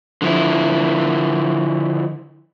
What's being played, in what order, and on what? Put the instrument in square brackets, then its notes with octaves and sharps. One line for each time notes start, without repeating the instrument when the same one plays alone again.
[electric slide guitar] D3 F3 E4